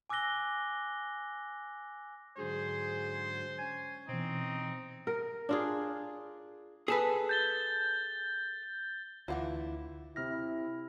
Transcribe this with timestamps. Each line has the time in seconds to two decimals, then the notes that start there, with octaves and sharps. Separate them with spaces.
0.10 G#5 D6 E6 F#6 A#6 G7
2.38 G#2 D3 F#3 G#4 C5
3.58 C#4 G#5
4.09 B2 E3 C4 D#4
5.07 A#4
5.49 D4 F4 G#4
6.88 G#4 A4 B4
7.29 G6 A6 G7
9.28 D2 E3 D4 E4 F4 B4 F5 F#5
10.16 C3 E4 F6 A#6